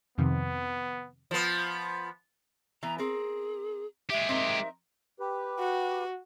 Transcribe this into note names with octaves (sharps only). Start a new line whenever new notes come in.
F2 C3 D#3 B3
F3 B3
E3 B3 A#5
C4 G#4 A#4
G#3 G4 E5
C4 D#4 A#4
G4 B4
F#4